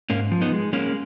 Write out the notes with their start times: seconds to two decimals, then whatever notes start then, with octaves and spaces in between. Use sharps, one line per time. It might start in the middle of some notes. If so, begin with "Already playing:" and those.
0.10 G#2 A#3 C#4
0.32 F3
0.41 B3 D#4
0.52 G#3
0.73 G#3 A#3 C#4